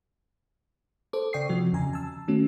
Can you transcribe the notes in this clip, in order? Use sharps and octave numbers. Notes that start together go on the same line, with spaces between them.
A4 C5 D6
C#3 D5 G5 C#6 D#6 C7
C3 F3 F#4
E2 C#3 G#5 A#5
A5 E6
D#3 A3 C#4 F#4